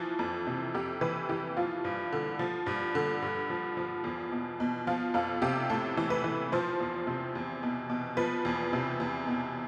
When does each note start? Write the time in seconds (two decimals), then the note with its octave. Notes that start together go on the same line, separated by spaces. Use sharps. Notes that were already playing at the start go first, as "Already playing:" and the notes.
Already playing: E3 F3
0.19 F2
0.47 C3
0.75 F2 G4
1.01 E3 B4
1.29 E3 G4
1.57 F3 F4
1.84 G2
2.12 D3
2.39 F3
2.66 G2
2.95 D3
3.22 G2
3.50 F3
3.77 F3
4.04 E2
4.32 B2
4.60 B2
4.87 F3 F4
5.14 F2 F4
5.42 C3 G4
5.70 A2 A4
5.97 E3
6.10 B4
6.24 E3
6.52 F3 C5
6.80 E2
7.07 C3
7.35 E2
7.63 B2
7.89 B2
8.17 F3 B4
8.45 E2
8.73 C3
9.00 E2
9.27 B2